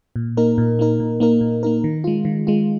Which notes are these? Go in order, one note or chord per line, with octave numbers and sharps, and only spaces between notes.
A#2
A#3 D#4 A#4
A#2
A#3 D#4 A#4
A#2
A#3 D#4 A#4
A#2
A#3 D#4 A#4
D#3
G#3 F4
D#3
G#3 F4